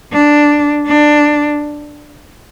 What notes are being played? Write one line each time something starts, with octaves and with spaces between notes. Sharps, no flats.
D4
D4